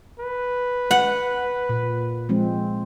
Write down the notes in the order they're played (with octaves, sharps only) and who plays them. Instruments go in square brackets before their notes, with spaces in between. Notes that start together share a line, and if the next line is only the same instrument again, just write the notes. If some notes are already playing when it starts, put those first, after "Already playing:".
[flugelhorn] B4
[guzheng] F#5
[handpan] A#2
F3 G#3 C4